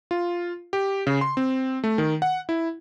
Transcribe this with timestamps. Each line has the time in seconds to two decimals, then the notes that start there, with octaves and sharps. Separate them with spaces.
0.11 F4
0.73 G4
1.07 C#3
1.21 C6
1.37 C4
1.84 A3
1.98 D#3
2.22 F#5
2.49 E4